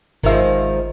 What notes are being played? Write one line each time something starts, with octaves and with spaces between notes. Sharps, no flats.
G#1 D#3 F3 G#3 E5